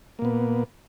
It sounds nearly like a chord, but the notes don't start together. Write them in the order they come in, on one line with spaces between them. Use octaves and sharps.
A#3 A#2 B3